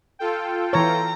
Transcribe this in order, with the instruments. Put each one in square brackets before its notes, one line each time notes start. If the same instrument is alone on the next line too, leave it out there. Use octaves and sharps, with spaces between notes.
[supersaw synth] F4 A4 G5
[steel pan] E3 C#5 [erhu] A#5